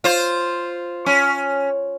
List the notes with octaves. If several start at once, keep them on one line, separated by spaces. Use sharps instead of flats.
F4 C5
C#4